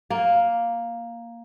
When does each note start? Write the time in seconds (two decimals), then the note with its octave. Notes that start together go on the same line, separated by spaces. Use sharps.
0.10 A#3